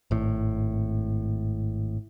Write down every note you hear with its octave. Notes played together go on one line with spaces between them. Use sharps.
G#1 A2